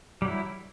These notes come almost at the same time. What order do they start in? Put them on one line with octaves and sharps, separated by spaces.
G3 F#3 E4